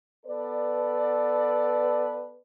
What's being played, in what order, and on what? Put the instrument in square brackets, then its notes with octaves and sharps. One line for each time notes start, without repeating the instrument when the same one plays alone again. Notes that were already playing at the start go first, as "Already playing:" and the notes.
[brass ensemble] B3 A4 B4 D5